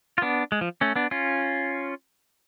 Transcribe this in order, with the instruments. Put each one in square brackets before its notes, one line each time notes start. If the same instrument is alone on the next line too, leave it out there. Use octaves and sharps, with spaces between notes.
[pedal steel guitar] F4
B3 D4
G#3
F3
A3 C#4
B3 D4
C#4 F4